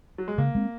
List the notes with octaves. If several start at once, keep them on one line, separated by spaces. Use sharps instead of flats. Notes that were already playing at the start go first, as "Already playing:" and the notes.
F#3
G#3
C#3 A#3
G#3 C4